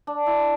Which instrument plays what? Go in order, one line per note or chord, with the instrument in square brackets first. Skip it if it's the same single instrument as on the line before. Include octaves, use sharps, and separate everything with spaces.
[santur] D4
E4